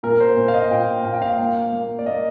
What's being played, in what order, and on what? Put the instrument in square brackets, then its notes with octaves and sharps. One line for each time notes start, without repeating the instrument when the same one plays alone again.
[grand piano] A#2 A#4
C5
A#2
F5
D#5
A#2 G5
A#2 F5
G5
F5
A#3
A#3
D5
A#3 D#5